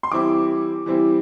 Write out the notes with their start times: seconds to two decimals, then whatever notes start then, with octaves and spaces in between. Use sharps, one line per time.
0.03 C6
0.12 E3 G3 C4 E4 D6
0.86 E3 G3 C4 E4